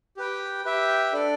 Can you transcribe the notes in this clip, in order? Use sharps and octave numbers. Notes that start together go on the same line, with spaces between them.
G4 B4 G5
G4 B4 E5 G5
D4 A4 D5